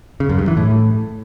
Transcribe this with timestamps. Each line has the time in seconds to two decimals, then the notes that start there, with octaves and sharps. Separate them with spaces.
0.20 C#3
0.29 F#2
0.39 G2
0.48 E3
0.57 A2